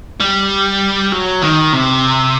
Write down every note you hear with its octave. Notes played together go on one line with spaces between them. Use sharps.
G3
F#3
D#3
C3